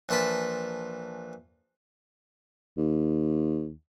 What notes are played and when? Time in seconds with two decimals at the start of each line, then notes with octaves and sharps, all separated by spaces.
0.09 A#1 E3 F4 A5 B5
2.78 D#2